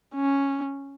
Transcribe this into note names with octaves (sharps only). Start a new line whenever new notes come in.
C#4